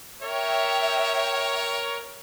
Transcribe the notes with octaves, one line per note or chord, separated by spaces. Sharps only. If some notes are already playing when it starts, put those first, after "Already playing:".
A#4 C#5 E5 G5